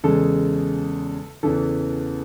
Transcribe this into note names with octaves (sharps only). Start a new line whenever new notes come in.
E2 C#3 G#3 A4
E2 C#3 E3 A4